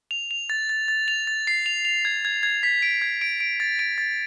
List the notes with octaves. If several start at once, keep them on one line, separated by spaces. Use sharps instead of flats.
F7
F7
A6
A6
A6
F7
A6
C7
F7
F7
G#6
G#6
G#6
B6
D7
G#6
D7
D7
A6
D7
A6